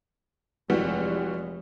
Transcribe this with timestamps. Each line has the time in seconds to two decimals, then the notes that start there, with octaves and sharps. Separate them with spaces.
0.70 F1 E3 G3 G#3 F#4